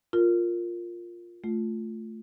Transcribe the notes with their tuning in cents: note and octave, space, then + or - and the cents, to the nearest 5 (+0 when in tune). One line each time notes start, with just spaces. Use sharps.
F4 +0 A#4 -5
A3 +0 F4 +0